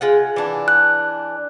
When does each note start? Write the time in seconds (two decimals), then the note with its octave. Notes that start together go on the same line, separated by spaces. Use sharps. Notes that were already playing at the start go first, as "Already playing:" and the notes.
0.01 G#3 F4 F#5
0.36 E3 D4
0.68 F#6